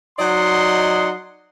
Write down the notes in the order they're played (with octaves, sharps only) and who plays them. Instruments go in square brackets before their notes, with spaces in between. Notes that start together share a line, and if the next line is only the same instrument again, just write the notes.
[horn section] F#3 D#4 D5 D#5 F#5 C6